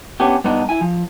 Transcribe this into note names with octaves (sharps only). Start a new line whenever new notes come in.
B3 C#4 D4 G4
G2 B3 D4 D#4
E4 G#5
F3